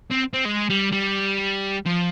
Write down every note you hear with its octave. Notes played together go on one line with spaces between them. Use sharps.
C4
C4
G#3
G3
G3
F3